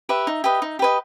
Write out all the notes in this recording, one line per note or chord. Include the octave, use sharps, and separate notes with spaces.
G4 B4 E5
D#4
G4 B4 D#5
D#4
G4 B4 D#5